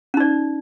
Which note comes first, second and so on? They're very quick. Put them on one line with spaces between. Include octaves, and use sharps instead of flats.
C#4 D#4 D5